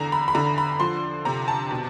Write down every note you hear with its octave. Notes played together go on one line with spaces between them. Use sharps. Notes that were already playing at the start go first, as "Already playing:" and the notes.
Already playing: E2 D3 A#5
B5
B5
D3 A#5
B5
F3 C6
C3 A#5
A5
B2